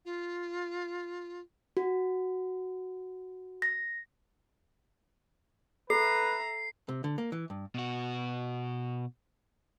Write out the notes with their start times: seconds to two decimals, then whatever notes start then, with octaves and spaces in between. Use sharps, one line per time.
0.05 F4
1.77 F#4
3.62 A#6
5.90 A4 B4 E5 A#5 C7
6.89 C3
7.04 D3
7.18 A#3
7.32 E3
7.50 G2
7.75 B2 F#4